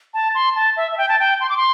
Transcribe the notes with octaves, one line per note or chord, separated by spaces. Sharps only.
A5
C6
A5
E5
E5
G5
A5
G5
C6
D6
C6